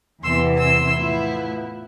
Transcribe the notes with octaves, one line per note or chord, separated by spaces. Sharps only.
E2 C3 E3 B3 E4 C6 E6
C6 E6
A2 F3 B3 E4